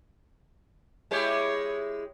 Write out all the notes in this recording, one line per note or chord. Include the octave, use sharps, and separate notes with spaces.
G#3 E4 G4 C#5